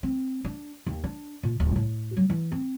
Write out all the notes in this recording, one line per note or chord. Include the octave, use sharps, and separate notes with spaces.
C4
D4
D#2
D4
A#2
D1
A2
F#3
E3
C4